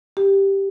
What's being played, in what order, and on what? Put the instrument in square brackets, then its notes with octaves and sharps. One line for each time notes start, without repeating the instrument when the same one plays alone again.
[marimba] G4